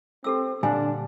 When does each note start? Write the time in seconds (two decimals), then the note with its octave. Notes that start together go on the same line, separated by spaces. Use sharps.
0.24 C4 G4 A4 E6
0.63 A#2 D3 G3 D4 G#5